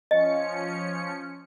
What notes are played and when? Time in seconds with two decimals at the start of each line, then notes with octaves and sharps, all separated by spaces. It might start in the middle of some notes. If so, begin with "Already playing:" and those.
0.11 F3 C#4 D#5 C#7